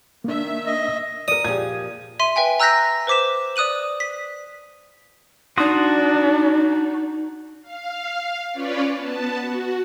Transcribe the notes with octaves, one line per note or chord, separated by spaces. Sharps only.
D#3 A#3 D4 E5
D#5
A#4 D5 D#6
A#2 F3 G4 G#4 G#6
E5 C6 D#7
B4 E5 G5 G#5
A#5 E6 F#6 G6 A#6 B6
B4 C5 D6 B6 E7
D5 D#6 F#6 D#7 F#7
B6
D4 D#4 F#4 C6 D#6
F5
C#4 F4 B4 C#5 D5
B3 A5
F#4